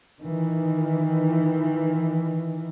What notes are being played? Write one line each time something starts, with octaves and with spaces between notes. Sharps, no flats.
D#3 E3